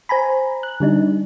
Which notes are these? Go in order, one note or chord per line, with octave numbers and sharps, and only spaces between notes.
C5 G#5 A#5 B5
F#6
D3 G3 D4 D#4